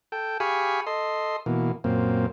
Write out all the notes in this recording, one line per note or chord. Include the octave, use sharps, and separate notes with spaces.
A4 G5
G4 G#4 F5 G#5 B5 C#6
A4 D#5 C6
B2 E3 A#3
F#2 A#2 A#3 C4